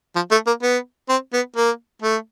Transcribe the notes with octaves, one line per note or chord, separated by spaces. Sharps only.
F3
A3
A#3
B3
C4
B3
A#3
A3